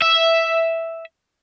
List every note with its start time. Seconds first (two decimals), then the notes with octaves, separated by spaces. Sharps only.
0.02 E5